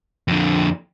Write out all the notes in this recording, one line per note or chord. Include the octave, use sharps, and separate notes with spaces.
F2 D3